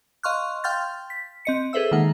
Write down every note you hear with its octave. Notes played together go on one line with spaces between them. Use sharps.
D#5 F5 C6 C#6 F6 F#6
F5 G5 C6 F6 G6 A6
B6
C4 D#5 C#7
G#4 A4 B4 C5 E5 E6
D#3 G#3 A#3 D#4 F#5